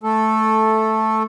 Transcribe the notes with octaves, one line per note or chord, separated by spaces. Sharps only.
A3 A4